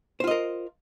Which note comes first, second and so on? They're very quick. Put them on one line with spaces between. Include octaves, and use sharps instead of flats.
C5 F4 D#5 A#4